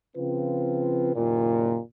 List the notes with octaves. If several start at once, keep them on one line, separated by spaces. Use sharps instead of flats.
C#3 F3 C4 F4 B4
F#1 D#2 A#2